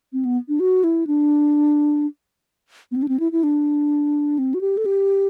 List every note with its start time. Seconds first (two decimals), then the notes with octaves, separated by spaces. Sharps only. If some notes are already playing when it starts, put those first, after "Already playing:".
0.13 C4
0.25 B3
0.48 D4
0.60 F#4
0.84 E4
1.07 D4
2.91 B3
2.96 C4
3.02 D4
3.09 C4
3.20 E4
3.32 E4
3.43 D4
4.39 C4
4.54 F#4
4.61 G4
4.77 A4
4.86 G4